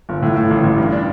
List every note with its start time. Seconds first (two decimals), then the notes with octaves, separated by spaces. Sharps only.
0.09 G1
0.22 A2
0.36 A2
0.50 A1
0.63 A1
0.78 G2
0.92 D4